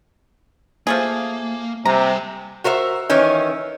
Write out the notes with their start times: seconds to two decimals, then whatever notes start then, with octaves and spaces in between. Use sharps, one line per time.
0.87 F3 A3 A#3 G#4
1.86 C3 G3 G#5 A#5
2.64 F#4 A#4 C5 E5
3.10 D#3 E3 C#4